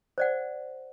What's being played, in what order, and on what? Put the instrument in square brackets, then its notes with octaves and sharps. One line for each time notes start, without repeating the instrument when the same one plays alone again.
[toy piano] C5 D5 F#5